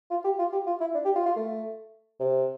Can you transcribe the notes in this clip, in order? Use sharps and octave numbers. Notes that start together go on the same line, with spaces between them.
F4
G4
F4
G4
F4
E4
D4
G4
F4
F4
A3
C3